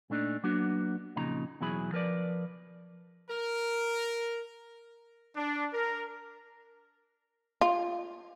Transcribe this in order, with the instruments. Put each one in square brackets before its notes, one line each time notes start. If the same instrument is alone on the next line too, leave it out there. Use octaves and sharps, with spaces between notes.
[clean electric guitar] A#2 A3 D4 D#4
F#3 A#3 B3 D4 F#4
F2 A#2 C#3 D#4 A#5
E2 B2 F#3 E4 G#4 B5
F3 A#4 B4 D5
[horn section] A#4
[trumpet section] D4
A#4
[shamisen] F4